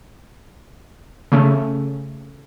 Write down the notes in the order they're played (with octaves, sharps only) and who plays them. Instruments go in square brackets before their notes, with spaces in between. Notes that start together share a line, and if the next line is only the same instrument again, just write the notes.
[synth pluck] C#3 A3 C#4